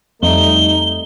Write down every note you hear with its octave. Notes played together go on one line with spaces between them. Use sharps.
F2 G3 A3 D#4 G7